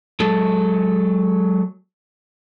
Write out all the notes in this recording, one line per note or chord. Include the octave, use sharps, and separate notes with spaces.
F#3 G#3 A4